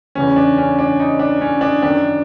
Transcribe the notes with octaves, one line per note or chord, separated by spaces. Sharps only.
E2 C#3 E3 C#4
D4
C#4
D4
D#4
D4
C#4
D4
F#2 D#3 D4